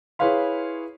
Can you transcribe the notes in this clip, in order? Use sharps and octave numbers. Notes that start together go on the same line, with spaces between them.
E4 G#4 B4 C#5 F5 C6